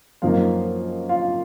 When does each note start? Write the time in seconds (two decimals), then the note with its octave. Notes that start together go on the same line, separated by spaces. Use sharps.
0.22 F#2 F3 A#3 D#4 F4 F5
1.09 F4 F5